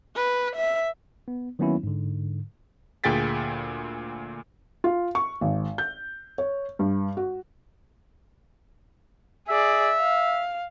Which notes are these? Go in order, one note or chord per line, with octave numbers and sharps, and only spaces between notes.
B4
E5
B3
D#3 F#3 A#3 B3 C#4 E4
G#2 D3
D2 A#2 G#4 G5 A6 B6
F4
C#6
G#1
G6
C#5
G2
F#4
G#4 D5 E5
F5